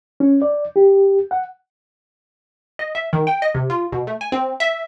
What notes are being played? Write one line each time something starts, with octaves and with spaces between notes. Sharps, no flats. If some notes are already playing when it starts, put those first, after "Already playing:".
C#4
D5
G4
F#5
D#5
E5
D#3
G5
D#5
C3
F4
B2
A3
G#5
C4
E5